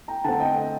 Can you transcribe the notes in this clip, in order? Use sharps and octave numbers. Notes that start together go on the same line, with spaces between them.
G5 A#5
D3 A3 C4 F#5 A5
D#5 G5
D#5 G5